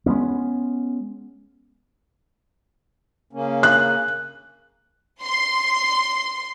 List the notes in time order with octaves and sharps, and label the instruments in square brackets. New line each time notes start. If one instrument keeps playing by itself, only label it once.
[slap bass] G#3 A#3 B3 C#4
[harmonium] C#3 A#3 C#4
[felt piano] F#6
[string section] C6